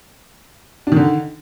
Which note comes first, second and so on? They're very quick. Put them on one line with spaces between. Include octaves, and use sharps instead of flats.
D4 D#3 D3